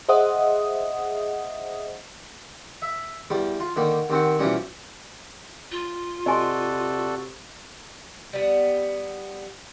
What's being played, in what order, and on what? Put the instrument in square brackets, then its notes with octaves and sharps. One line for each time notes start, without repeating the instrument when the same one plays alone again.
[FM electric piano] G#4 C5 D#5 E5 F#5 D#6
[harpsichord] E5
E2 G3
F4
D3 D#3 A#3
D#2 C4 F#4
B2 E3 F3 G3 C#4
[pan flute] F4
[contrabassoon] C3 [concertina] F#4 A4 D5 [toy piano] D#5 G#5 C6
[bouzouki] G3 B3